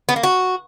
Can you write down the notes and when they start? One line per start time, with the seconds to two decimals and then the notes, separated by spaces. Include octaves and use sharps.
0.09 B3
0.16 A#3
0.23 F#4